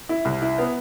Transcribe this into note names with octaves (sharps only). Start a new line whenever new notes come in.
E4
C2
E4
B3